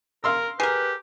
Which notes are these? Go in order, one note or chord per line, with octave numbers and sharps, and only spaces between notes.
A#4 F5 C6 E6
G4 G#4 A#4 B4